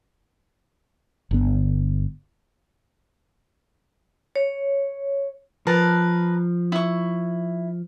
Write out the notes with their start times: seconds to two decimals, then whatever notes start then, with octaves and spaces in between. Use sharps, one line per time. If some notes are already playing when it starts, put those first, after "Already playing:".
1.31 G1 D3 B3
4.36 C#5
5.67 F3 A#4 B4 A5
6.72 E4 C#6